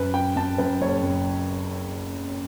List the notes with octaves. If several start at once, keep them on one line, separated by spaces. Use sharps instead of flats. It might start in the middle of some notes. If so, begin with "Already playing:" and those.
Already playing: F#2 B4
F#2 G5
F#2 A5
F#2 B4
F#1 C#5
F#2